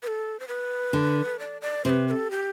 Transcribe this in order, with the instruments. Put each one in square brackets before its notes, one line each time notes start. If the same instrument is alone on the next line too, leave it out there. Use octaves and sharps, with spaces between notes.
[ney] B4
A4
C5
B4
[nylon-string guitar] D3
[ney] D5
D5
[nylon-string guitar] C3 [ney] B4 C5
[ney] B4
A4
G4